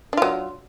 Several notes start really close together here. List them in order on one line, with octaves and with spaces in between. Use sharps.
D4 F4 F#3